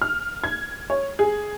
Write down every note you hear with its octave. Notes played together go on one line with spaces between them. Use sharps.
F6
G#6
C#5
G#4